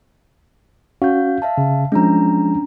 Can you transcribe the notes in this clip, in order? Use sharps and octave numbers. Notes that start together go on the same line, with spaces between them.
C#4 F#4 F5 G6
E5 F5 A5
C#3
F3 G#3 C#4 D4 A#5